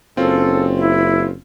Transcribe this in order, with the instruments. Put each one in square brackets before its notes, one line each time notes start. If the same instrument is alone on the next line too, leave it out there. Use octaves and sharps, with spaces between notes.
[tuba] F#1 [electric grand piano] C4 C#4 F4 [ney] A4
[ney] E4